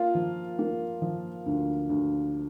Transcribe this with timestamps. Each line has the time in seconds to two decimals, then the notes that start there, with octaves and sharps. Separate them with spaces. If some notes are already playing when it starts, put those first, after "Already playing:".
Already playing: A#3 F4
0.15 F3
0.59 A#3
1.02 F3
1.46 D2
1.89 D2